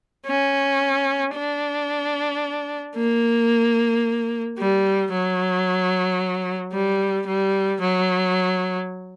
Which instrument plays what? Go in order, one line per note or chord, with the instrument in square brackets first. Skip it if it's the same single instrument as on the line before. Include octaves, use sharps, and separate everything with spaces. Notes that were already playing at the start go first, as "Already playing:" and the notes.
[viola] C#4
D4
A#3
G3
F#3
G3
G3
F#3